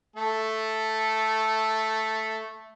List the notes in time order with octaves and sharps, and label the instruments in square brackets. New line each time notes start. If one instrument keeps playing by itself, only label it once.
[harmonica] A3 A4